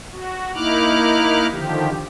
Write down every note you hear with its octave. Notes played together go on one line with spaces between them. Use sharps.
F#4
A#3 D#4 E4 D6 F6 F#6
D3 D#3 F3 G4